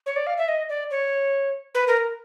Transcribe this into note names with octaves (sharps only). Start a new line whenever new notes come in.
C#5
D5
F5
E5
D#5
D5
C#5
B4
A#4